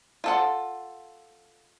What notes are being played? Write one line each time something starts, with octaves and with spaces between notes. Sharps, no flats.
F4 A4 F#5